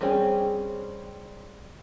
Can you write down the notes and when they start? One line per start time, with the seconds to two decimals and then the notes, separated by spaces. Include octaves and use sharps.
0.01 G3 C4 C#4 G#4 G5